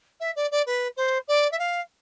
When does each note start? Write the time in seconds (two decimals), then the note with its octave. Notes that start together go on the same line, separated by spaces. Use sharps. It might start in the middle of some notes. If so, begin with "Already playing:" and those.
0.20 E5
0.36 D5
0.51 D5
0.66 B4
0.97 C5
1.28 D5
1.51 E5
1.59 F5